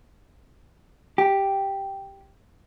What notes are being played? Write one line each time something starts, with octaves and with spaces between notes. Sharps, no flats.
G4